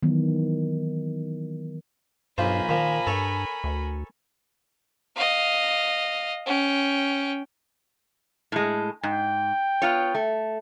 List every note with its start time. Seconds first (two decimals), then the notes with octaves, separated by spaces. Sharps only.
0.03 D#3 E3 F#3 B3
2.38 B1 G2 F4 A#4 C5 G#5 B5
2.69 A#2 D#3 F3
3.07 G2 A4 C#5
3.64 D2
5.16 D#5 F5
6.46 C#4 G5
8.52 A2 G#3
9.03 G#2 G5
9.82 B3 F4 C#5
10.14 A3